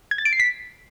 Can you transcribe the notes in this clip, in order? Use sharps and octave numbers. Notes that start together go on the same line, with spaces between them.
G#6
A6
D7
C7
B6